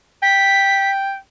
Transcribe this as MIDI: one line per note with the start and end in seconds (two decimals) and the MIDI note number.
0.23 1.16 79
0.23 0.91 95